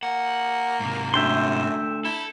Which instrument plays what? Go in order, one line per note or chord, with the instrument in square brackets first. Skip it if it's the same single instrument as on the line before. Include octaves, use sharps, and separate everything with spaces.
[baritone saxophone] A#3 [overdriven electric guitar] F#5
[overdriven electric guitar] G#2 C3
[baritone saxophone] F#2 [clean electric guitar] D3 A3 [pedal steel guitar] E5 G5 C6
[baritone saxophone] E4 [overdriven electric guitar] A4